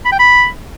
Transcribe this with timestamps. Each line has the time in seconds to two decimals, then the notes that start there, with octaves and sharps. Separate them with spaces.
0.05 B5
0.12 G5
0.19 B5